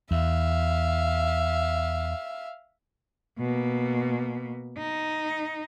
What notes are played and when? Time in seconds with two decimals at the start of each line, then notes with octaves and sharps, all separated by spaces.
0.11 E2 E5 F5
3.38 B2 A#3
4.78 D#4